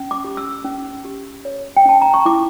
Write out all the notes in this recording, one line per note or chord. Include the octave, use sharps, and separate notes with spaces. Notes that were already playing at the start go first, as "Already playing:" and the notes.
Already playing: C#4
D6
G4
E6
C#4
G4
C#5
G5
C#4 A5
A#5
C#6
E4 D6